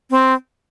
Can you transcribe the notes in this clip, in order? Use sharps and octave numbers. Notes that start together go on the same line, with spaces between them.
C4